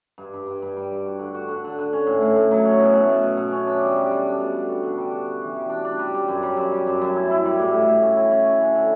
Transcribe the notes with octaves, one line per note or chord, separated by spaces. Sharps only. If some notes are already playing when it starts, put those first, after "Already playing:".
G2
G2
G2
G2
G3
G2
F#4
D3
F#4
D3
D3
D3
C#4
A2
A2
A2
F#3
C#4
B2
A3
B2
B2
B2
C#4
D4
G3
G3
G3
D4
B2
D3
F#4
D3
G3
F#4
F#4
E3
G3
D4
D4
G3
G3
F#2
G3
F#2
G3
F#2
F#2
E4
E4
G3
A2
A2
A2
C#4
E4
C#4
C#4
D3
D3